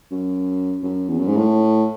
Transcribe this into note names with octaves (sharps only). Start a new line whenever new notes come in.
F#2
F#2
E2
F#2
G#2
A2